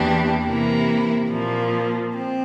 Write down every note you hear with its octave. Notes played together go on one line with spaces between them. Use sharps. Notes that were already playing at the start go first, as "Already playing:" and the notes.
Already playing: E2 E3 A#3 D4 G4
C3 E3 A#3 E4 A#4
A#2 F3 A#3
C4